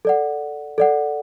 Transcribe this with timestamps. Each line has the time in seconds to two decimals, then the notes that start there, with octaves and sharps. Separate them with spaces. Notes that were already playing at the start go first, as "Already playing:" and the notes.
0.05 A4 D5 F#5
0.78 A4 D5 F#5